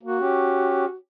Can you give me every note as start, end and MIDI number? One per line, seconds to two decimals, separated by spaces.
0.03 0.18 58
0.03 0.95 66
0.19 0.85 61
0.19 0.85 67